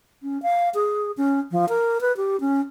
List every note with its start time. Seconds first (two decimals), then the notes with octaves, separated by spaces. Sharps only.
0.23 C#4
0.43 F5
0.75 G#4
1.17 C#4
1.51 F3
1.69 A#4
2.01 B4
2.17 G4
2.40 C#4